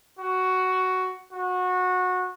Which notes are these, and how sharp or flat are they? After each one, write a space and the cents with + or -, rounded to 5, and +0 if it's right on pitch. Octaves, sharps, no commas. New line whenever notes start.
F#4 +5
F#4 -20